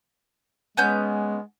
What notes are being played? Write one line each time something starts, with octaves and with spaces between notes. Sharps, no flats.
G#3 B3 C#4 G6